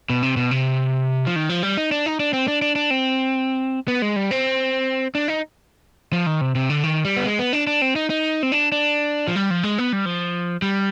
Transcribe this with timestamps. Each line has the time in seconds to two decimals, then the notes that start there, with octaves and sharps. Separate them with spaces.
0.10 B2
0.22 C3
0.37 B2
0.51 C3
1.26 F3
1.36 D#3
1.49 F3
1.63 G3
1.77 D#4
1.92 D4
2.06 D#4
2.20 D4
2.33 C4
2.48 D4
2.62 D4
2.76 D4
2.90 C4
3.88 B3
4.02 G#3
4.16 G3
4.31 C4
5.15 D4
5.28 D#4
6.13 F3
6.27 D#3
6.41 C3
6.55 C3
6.70 D3
6.84 D#3
7.05 G3
7.17 B3
7.26 G#3
7.39 B3
7.53 D4
7.67 D4
7.82 C4
7.96 D#4
8.10 D#4
8.43 C4
8.52 D4
8.72 D4
9.28 F3
9.36 G3
9.51 F3
9.63 G#3
9.78 B3
9.93 G3
10.06 F3
10.62 G3